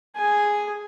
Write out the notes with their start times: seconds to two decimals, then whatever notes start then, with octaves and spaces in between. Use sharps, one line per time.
0.16 G#4 G#5